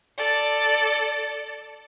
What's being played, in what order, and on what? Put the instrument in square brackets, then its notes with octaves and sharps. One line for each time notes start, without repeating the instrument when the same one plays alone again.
[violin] A4 D5